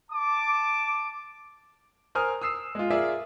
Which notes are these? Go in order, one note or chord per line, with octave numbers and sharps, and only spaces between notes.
A5 D6
A#4 C5 G#5 A#5 D#6 F6
D#6 E6 C7 E7
G#3 F4
F4 G#4 A#4 D5 E5